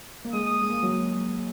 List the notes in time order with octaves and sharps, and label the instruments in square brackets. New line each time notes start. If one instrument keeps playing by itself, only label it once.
[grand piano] A#3
[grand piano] G#3 [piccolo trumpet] D#6
[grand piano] G#3
A#3
F#3